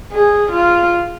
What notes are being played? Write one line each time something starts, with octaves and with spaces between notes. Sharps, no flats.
G#4
F4